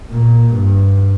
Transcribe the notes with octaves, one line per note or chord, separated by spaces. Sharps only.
A#2
G2